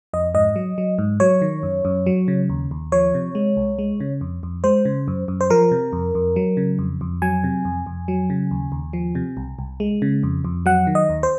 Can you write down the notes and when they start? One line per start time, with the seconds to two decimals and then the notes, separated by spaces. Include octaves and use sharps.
0.13 F2 D#5
0.34 G#2 D#5
0.56 F#3
0.78 F#3
0.98 G#2
1.20 F#3 C#5
1.42 D#3
1.63 F#2
1.85 F#2
2.06 F#3
2.28 C#3
2.49 D#2
2.71 D#2
2.92 F3 C#5
3.14 C3
3.35 G#3
3.57 C2
3.79 G#3
4.00 C#3
4.21 F2
4.43 F2
4.64 G#3 C5
4.85 C#3
5.08 F#2
5.28 F#2
5.41 C5
5.50 F3 A#4
5.72 C3
5.93 F2
6.15 F2
6.36 F#3
6.57 C#3
6.79 F2
7.01 F2
7.22 F#3 G#5
7.44 C3
7.65 F2
7.86 F2
8.08 F#3
8.30 C#3
8.51 D#2
8.72 D#2
8.93 F3
9.15 C3
9.37 C2
9.59 C2
9.80 G#3
10.02 C#3
10.23 F2
10.45 F2
10.66 F#3 F#5
10.87 D#3
10.95 D#5
11.09 D#2
11.23 C5